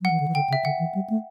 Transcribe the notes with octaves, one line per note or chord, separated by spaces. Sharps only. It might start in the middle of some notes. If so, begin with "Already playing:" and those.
F#3 F#5
E3
D3
E3
D3 G5
C#3
E5
D3 F#5
E3
G3
A3